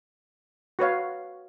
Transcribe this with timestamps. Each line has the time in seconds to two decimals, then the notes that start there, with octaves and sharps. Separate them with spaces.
0.79 F#4 B4 C#5 F5